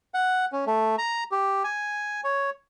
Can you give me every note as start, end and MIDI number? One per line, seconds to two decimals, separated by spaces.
0.14 0.45 78
0.52 0.65 61
0.67 0.96 57
0.98 1.24 82
1.32 1.63 67
1.64 2.21 80
2.24 2.50 73